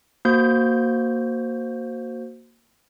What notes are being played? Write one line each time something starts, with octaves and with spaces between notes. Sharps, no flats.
A#3 F#4 C5 G6